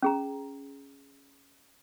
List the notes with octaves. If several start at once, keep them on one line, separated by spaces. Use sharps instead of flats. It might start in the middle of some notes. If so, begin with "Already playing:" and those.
C#4 G#4 A#5